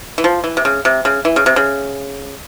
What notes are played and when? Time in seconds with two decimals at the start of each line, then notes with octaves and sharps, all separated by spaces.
0.18 E3
0.24 F3
0.44 E3
0.57 C3
0.65 C#3
0.85 C3
1.05 C#3
1.25 E3
1.36 C#3
1.46 C3
1.56 C#3